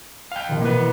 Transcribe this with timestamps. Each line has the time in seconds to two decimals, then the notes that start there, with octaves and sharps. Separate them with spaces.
0.32 F5 G5
0.48 A#1 C3 D#3
0.61 B2 E3 A#3 B4